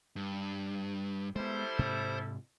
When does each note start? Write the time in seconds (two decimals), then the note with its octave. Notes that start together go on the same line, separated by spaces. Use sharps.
0.16 G2
1.36 G3 G#3 B3 E4 A4 C5
1.79 G#2 C3